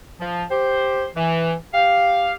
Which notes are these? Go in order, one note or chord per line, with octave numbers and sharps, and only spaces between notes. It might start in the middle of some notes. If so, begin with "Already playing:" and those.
F3
G4 C5
E3
G4 F5